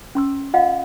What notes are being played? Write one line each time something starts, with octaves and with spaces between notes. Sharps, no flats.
C#4 C6 E6
F4 D#5 F5 F#5